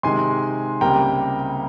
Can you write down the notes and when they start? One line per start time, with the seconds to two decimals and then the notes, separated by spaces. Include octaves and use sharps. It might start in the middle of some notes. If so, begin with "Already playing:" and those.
0.03 C3 D#3 G#3 G#5 C6
0.81 C#2 C3 G3 A#3 G5 A#5